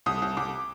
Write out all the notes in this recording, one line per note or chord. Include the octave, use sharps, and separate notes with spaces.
C2 D#6
C2
C2 D6